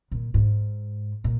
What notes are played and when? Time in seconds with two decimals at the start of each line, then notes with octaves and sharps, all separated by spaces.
0.12 A#2
0.34 G#2
1.24 A#2